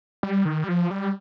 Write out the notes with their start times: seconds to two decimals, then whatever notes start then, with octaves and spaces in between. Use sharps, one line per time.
0.23 G3
0.45 D#3
0.64 G3
0.69 F3
0.91 G3